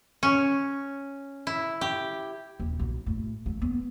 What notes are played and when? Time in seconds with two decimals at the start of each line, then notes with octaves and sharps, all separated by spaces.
0.23 C#4
1.47 E4
1.81 G4
2.60 D#1
2.79 B1
3.06 A2
3.46 A3
3.62 B3